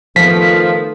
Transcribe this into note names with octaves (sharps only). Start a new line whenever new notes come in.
D#3 F3 A3 B3 B6